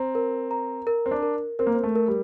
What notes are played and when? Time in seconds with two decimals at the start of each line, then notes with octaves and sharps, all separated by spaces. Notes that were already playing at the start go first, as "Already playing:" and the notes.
Already playing: C4 A#5
0.15 A#4
0.51 A#5
0.87 A#4
1.06 C4
1.11 D4
1.23 A#4
1.59 C4 A#4
1.67 A#3
1.74 C4
1.83 A3
1.96 A#4
2.08 G3